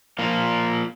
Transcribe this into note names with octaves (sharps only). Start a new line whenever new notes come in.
F3 A#3 F4